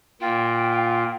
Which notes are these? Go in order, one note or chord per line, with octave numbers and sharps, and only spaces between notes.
A#2 F4 G5